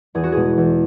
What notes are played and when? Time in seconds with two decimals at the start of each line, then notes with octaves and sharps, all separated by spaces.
0.15 E2 G#4
0.24 F#4
0.32 B2 G#3 G#4
0.57 E2